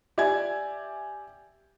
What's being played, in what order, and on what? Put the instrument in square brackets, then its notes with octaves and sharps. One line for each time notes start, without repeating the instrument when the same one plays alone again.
[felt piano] G4 D5 E5 G#5 G#6